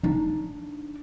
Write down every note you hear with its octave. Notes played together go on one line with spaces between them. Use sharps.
D4 D#4